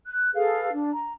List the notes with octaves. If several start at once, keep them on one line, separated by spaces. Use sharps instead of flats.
F#6
G#4 A4 B4 F5
D4
A#5